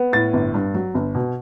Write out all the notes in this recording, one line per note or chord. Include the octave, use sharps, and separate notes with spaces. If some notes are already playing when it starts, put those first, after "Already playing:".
Already playing: B3
A2 A6
G1
G2
F#3
G1
B2